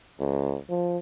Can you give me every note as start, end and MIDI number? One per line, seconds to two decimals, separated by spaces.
0.20 0.57 37
0.70 0.98 53